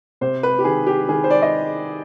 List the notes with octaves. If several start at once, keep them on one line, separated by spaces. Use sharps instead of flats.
C3 C5
B4
G4
D#3 G#4
G4
D#3 G#4
C5
D5
D#5